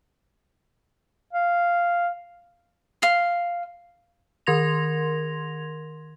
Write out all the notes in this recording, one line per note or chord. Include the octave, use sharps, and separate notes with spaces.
F5
F5 C6
D#3 A#4 C6 G#6 A#6 F7